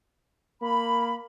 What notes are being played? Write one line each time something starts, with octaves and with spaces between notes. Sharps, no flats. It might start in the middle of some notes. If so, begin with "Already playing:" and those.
A#3 B5